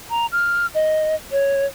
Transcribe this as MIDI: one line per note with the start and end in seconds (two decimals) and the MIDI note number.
0.10 0.26 82
0.32 0.66 89
0.74 1.15 75
1.31 1.66 73